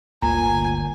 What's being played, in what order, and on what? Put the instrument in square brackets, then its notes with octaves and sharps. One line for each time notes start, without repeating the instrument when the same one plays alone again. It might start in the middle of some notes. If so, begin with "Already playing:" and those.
[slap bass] G1 D2 [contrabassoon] A#2 [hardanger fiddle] G#5 [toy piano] A#5